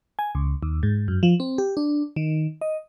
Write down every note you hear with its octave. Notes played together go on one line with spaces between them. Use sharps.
G#5
C#2
D#2
G#2
F#2
F3
C4
G4
D4
D#3
D#5